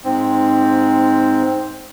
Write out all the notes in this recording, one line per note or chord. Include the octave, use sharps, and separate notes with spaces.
G#2 C4